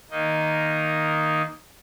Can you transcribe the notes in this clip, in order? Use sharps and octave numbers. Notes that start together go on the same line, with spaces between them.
D#3 A#3 D#4 D#5